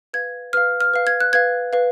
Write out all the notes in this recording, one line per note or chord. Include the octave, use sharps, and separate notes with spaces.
B4 F5 G#6
B4 F5 F6
F6
B4 F5
G#6
F#6
B4 F5 G#6
B4 F5